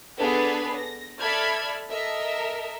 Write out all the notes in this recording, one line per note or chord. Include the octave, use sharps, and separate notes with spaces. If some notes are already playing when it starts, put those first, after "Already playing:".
B3 D4 G#4 A4 B4
A#6
A4 D5 E5 B5 F6 G#6
A4 A#4 D#5 E5